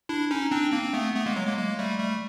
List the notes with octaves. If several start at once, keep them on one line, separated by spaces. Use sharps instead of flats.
D4 E4
C#4 D#4
C4 D4
A#3 C4
C4
A3 B3
A3 B3
G#3 A#3
F#3 G#3
G#3 A#3
G#3 A#3
G3 A3
G3 A3